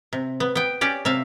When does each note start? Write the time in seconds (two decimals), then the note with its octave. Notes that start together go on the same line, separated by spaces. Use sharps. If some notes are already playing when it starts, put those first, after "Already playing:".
0.13 C3
0.40 B3
0.55 B3 G5
0.81 C#4 G4 D5
1.05 C3 E5 F5